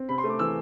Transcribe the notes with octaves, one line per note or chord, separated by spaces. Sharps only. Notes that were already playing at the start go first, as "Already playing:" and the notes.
Already playing: C4
C3 B5
C6
A3
D6
E3 E6